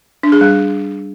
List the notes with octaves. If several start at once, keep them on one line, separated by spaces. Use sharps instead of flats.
D4
G#4
G3